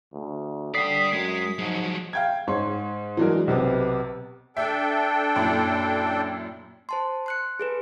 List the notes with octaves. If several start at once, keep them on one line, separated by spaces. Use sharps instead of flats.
D2
D3 D5 G5 D#6 B6 C7
F#2 G#3
G#2 F3 F#3
F5 G5 G#6
G#2 C#5 C6
E3 F#3 G#3 D4 A#4
B1 C3 B3
D4 A4 E5 G5
F#2 A#2 E4
C5 A5 C6
C6 F#6 C#7
G#4 A4 B4